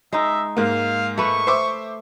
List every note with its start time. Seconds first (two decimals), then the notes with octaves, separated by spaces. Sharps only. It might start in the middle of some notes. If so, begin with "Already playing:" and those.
0.13 G#3 D#4 E5
0.57 G#2 A#3 F5
1.18 A3 B4 C#6
1.47 C5 E5 D6